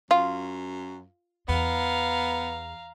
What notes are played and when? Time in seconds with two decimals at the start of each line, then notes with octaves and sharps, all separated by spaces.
0.11 F#2 F4
1.48 E2 B3 F5 A#5